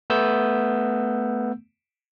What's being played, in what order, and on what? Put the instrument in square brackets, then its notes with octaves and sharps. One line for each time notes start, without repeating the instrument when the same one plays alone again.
[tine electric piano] A3 B3 E6 G6